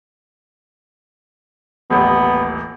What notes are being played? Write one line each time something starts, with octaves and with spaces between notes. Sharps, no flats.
D#1 A1 B3